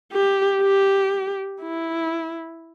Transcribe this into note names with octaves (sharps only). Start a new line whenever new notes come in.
G4
G4
E4